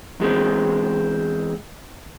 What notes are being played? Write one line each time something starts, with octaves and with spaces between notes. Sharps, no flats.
E2 G#3 C4